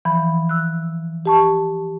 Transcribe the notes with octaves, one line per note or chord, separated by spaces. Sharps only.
E3 F3 B5
E6 F#6
G4 A5 C#6